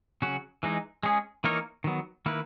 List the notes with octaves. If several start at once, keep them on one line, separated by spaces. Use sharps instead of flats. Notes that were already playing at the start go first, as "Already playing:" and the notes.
C#3 F#3 C#4 F#4
E3 G#3 D#4
G#3 C#4 G#4
E3 A#3 D#4 A#4 C#5
D#3 F#3 B3
D#3 A#3 E4 B4